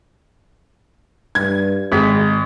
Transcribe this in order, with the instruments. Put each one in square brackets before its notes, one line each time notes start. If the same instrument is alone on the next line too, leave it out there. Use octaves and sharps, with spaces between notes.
[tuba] G2 [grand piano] G#6
[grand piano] G#1 B6 [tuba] G#3